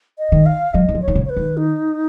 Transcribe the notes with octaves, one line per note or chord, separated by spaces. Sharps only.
D#5
D#3
F5
F#3 D#5
D#3
F3
C#5
D#3
C#3
C#5
B4
D#3
D#4